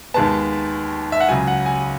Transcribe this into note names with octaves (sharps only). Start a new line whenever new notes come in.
D#2 D#3 G#3 B3 A5
E5
F#5
C#2 C#3 F#3 G#5
F#5
G#5